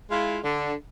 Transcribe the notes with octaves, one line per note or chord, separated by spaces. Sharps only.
G#3 E4 F4
D3